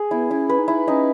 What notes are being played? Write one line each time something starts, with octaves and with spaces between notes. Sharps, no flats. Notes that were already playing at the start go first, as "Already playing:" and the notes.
Already playing: G#4
B3 E4
C#4 E4
B4
D#4
E4
C#4 D#4